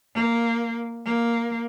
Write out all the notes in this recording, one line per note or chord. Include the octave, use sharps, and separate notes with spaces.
A#3
A#3